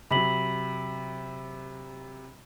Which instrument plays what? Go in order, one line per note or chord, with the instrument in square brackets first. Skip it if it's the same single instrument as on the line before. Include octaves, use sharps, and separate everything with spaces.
[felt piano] C3 F#3 [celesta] B5 B6 F#7